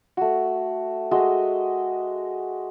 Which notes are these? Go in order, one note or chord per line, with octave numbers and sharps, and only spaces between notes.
A3 F#4
G#3 F#4 D#5 E5